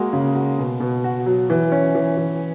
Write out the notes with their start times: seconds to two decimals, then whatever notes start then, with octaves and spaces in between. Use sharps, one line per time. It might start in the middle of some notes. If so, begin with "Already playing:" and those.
Already playing: G#3 A#3 F#4
0.13 C#3
0.35 F#4
0.59 B2
0.80 B2
1.04 F#4
1.26 F#3
1.50 E3
1.72 C#4
1.95 E3
2.17 E3